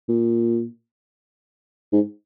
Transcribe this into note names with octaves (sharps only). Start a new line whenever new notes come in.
A#2
G#2